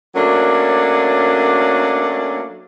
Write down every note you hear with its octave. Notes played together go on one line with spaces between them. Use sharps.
F#3 A3 A#3 C#4 D4